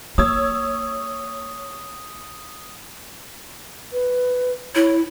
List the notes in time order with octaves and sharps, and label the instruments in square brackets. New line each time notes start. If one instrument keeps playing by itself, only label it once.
[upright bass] A#3 [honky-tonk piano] C#5 E6 G#6 [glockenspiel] D#6
[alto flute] B4
[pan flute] E4 [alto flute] C#5